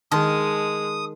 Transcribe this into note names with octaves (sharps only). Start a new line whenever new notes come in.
D#3 G#3 A5 C6 D#6